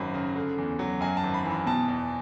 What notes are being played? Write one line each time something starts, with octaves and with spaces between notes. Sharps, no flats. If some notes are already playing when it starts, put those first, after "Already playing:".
Already playing: G#1 F#2 F#3 B5
C#3
D3
E2
F#3
F#2 G#5
A5
G#1
B5
E3
B5
B2 A5
E2